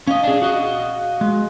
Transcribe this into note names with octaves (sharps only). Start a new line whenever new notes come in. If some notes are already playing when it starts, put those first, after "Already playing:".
C#4 D#5 F5
D4 G#4
F#4 D#5
G#3 F#4